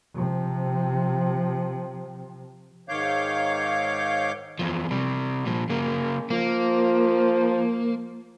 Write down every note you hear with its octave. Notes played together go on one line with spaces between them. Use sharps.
C3 F3
G#2 D#3 C#5 F5 D6 G6
E2 F3
C3 G3
A#2 F3
C#3 A#3
F3 A#3